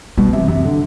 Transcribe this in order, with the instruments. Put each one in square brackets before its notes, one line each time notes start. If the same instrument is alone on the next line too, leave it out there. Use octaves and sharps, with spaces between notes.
[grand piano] B2 [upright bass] G3
[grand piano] C3 [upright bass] E3
[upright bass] F#2 [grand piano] C3
[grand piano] D3